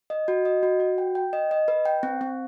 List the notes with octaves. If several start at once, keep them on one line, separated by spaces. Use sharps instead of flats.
D#5
F#4
D#5
F#4
F#4
G5
G5
D#5
D#5
B4
G5
C4
C4